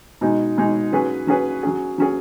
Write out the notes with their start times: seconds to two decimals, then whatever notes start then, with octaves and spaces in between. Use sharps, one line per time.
0.21 B2 G#3 D#4
0.58 B2 G#3 D#4
0.92 F#3 C#4 G#4 B4
1.27 F#3 C#4 G#4 B4
1.63 F#3 C#4 G#4
1.98 F#3 C#4 G#4